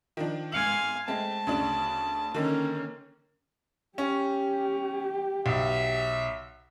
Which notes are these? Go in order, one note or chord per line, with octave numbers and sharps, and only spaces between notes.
D#3 F3 D4
G#2 F5 G#5 C#7 F#7
G#3 A3 C4 A5
D2 C#3 D4
D3 D#3 A#3 C#4
C#4 G4
B1 E5